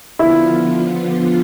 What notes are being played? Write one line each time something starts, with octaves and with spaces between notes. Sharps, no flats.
D3 F3 B3 E4 F4